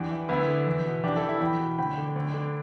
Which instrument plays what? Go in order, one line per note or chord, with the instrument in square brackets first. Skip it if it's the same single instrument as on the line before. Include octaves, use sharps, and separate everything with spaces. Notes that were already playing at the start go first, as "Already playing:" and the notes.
Already playing: [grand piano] E2 D4 G4
E3
D2 B3 E4
D3
E2
B2
E2 D4 G4
E4 A4
E3
E4 A4
E2 G5 B5
B2
D2 G5 B5
D3
D2
D3